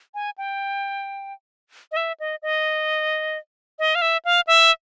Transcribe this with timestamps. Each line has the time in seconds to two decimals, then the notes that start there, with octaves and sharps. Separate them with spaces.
0.14 G#5
0.38 G5
1.92 D#5
1.97 E5
2.20 D#5
2.42 D#5
3.79 D#5
3.95 F5
4.02 E5
4.25 F5
4.47 E5